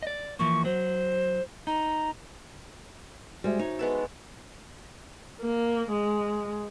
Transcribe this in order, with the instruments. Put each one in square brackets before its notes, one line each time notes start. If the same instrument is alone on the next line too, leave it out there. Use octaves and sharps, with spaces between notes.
[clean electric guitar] D5 D#5
[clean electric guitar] E3 F3 A#3 [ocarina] C#6
[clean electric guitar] F#3 [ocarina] C5
[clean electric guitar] D#4 [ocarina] A#5
[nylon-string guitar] G3 G#3 [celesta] F#4 C5 E5
[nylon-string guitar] D#4 [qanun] C#5
[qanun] G#3 B3 A4
[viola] A#3
G#3